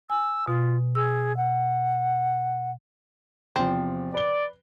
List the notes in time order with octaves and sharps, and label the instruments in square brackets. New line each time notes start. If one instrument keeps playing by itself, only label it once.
[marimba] G#5 [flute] E6
[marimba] B2 [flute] F4
[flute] G#4 [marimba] E6
[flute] F#5
[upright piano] E2 C3 F3 [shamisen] C4
[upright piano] B4 G7 [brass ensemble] D5